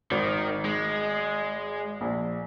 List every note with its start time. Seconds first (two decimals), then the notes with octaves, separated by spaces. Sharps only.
0.11 G#1 D#3
0.65 G#3
2.01 A#1